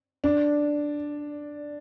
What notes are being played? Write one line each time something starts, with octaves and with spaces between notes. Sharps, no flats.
D4